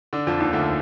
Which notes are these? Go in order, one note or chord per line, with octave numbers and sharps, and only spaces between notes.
D3 D4
F2 F3
D#2 D#3
D2 D3